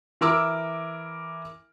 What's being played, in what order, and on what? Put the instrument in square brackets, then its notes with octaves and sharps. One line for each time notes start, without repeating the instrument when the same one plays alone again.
[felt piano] E3 A#4 D6 E6